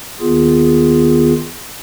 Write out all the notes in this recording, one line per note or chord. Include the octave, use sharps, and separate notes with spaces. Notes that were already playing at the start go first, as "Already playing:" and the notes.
D#2 D#3 B3 F4 G#4